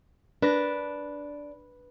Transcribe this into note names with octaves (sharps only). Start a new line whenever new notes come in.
D4 B4 A#6